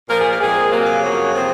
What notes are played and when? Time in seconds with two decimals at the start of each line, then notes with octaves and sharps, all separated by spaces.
0.09 A#2 F3 A#3 A#4
0.19 G#4
0.30 A#4
0.40 A#2 G#3 C4 G#4
0.71 C3 F#3 A#3
0.86 G#4
1.02 F2 C#3 F#3 A#3
1.33 C3 F3 C4